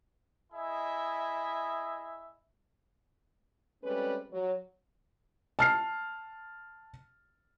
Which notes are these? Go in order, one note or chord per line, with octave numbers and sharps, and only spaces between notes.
E4 G#4 D#5 E5
G3 G#3 C4 C#4 A4 B4
F#3
A5 F6 C7